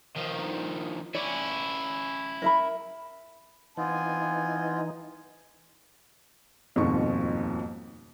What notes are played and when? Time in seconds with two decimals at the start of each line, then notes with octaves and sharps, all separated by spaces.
0.16 D#3 F3
1.14 C#4 E4 D5
2.42 A#4 E5 B5
3.77 E3 B3 C4 D#4 F4 G#5
6.76 D#1 F2 G#2 B2 F4 C#6